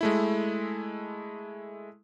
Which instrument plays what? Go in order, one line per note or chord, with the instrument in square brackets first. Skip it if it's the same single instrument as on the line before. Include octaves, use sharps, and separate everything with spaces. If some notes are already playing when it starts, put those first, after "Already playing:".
[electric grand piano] G#3 A3 E4